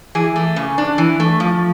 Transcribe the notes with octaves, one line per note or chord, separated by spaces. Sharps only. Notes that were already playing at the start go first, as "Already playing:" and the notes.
E3 G#4
A3
C#3
D4
E3
A3
F3